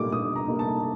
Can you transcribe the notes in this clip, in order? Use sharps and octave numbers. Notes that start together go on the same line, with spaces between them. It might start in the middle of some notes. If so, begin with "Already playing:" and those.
Already playing: A#2 G3 A#3 D#4 D6
A#2 D#6
A#5
G3 A#3 D#4
A5